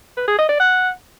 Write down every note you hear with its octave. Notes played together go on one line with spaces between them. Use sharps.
B4
G#4
D#5
D5
F#5